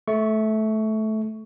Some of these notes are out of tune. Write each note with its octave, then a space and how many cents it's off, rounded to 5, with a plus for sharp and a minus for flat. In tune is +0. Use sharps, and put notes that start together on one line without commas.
A3 -15 C#6 +10